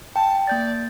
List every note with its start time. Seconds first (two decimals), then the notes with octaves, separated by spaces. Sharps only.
0.16 G5 A5
0.47 A#3 D5 G6 A6